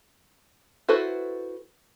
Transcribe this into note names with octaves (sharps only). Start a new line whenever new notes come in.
E4 F#4 A4 B4 C5